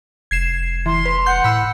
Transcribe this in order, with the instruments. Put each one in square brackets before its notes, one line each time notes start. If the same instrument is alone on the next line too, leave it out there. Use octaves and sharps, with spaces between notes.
[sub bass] F1 [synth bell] G#6 C7 E7
[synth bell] E3 [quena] C6
[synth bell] B4
[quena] F#5 [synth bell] C6 G6
[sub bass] A2 [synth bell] B5 E6